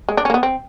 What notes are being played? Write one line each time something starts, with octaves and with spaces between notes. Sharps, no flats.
G#3
D4
C#4
A#3
B3
C4